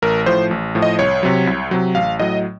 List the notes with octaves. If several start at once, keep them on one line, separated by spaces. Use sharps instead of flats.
A1 A#4
A2 F3 C5
A1
A2 F3
D#5
C2 C#5
C3 F#3
C2
C3 F#3
A1 F5
A2 F#3 D#5